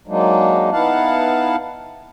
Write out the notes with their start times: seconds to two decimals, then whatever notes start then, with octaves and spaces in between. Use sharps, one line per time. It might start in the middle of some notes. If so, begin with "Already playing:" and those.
0.07 F#3 G#3 A#3 D4 D#4
0.72 B3 D#4 E4 F5 F#5 A5